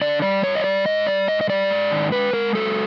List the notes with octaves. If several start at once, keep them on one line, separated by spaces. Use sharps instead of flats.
D3 D5
G3 D5
G2 C#5
D#5
G3 D5
G#2 D#5
G3 D5
G#2 D#5
D#5
G3 D5
G#2
D#3
G#3 B4
G#3 A#4
F#3 A4